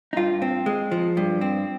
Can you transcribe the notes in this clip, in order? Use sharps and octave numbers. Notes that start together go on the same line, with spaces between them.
D#4
G2 F4
C4
G#3
F3
G2
C4